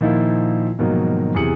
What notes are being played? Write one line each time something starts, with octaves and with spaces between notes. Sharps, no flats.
A#2 D#3 F3 D#4 E4
G#2 B2 D#3 F3 F#3 A#3
E2 C3 E3 G#4 C#7 F#7